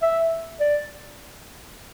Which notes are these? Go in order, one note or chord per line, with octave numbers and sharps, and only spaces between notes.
E5
D5